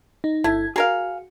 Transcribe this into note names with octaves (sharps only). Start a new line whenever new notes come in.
D#4
G1 A3 E4 G#6
F#4 G#4 A#4 F5